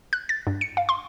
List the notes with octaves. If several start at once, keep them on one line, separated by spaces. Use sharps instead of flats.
F#6
A6
G2
C#7
F5
C6